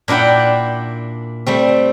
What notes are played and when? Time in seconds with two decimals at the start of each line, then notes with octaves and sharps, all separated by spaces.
0.08 A#2 D4 E4 F#5 G5
1.46 G3 A3 C4